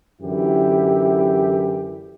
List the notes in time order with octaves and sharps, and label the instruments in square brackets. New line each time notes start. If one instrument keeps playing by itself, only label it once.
[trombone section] F#2 D3 E3 E4 G4